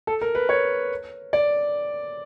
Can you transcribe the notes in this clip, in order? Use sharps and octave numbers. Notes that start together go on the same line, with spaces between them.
A4
A#4
B4
C#5
D5